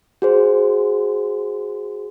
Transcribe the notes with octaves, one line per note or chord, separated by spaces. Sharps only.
F#4 G#4 C5